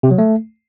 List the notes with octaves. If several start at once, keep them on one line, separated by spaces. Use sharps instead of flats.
C3
F#3
A3